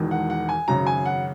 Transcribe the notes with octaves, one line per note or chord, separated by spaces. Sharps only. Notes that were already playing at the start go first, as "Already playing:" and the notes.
Already playing: E1 E2 D#3 G#3
F#5
F#5
G#5
G#1 F#2 C#3 A#5
G#5
F#5